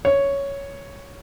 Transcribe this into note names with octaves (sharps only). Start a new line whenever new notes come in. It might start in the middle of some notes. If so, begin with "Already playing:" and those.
C#5